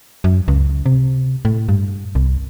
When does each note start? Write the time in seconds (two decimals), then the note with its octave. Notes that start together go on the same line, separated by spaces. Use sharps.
0.24 F#2
0.48 C#2
0.86 C3
1.45 A2
1.69 G2
2.15 C2